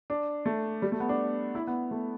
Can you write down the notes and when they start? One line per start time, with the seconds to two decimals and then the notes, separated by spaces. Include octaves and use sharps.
0.10 D4
0.46 A3
0.82 G3
0.92 A3
1.00 B3
1.09 D4
1.55 E4
1.67 B3
1.91 A3